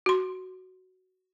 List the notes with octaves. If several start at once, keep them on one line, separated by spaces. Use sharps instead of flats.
F#4 C6